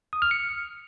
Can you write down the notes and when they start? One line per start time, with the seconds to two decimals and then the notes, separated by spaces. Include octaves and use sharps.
0.13 D#6
0.22 F6
0.31 C#7